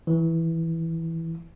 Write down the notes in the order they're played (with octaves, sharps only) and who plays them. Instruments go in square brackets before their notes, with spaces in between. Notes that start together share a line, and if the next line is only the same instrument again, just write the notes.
[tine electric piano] E3